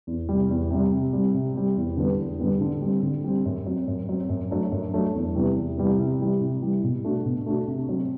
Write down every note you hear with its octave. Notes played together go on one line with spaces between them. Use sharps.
E2
C3 G3
E2
C3 G3
C3
G3 C4
C3
G3 C4
E2
D3 G3 B3
E2
D3 G3 B3
D3
G3 C4
D3
G3 C4
F#2
F#3 C4
F#2
F#3 C4
F#2
F#3 A3 D4
F#2
F#3 A3 D4
E2
C3 E3 G3 B3
E2
C3 E3 G3 B3
C3
E3 G3
C3
E3 G3
B2
A3 D4 F#4
B2
A3 D4 F#4
C3
F#3 C4